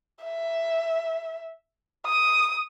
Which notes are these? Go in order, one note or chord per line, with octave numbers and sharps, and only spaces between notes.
E5
D#6